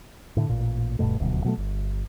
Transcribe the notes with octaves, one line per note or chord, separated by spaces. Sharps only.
A2 D3
A1 A#2
D#1 G2 B2 A3
D#1 D2 B2 F#3
B2 F#3 G#3 A3
G1